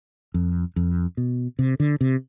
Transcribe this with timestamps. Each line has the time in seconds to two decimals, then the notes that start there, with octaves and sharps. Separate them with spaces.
0.34 F2
0.76 F2
1.17 B2
1.59 C3
1.80 D3
2.01 C3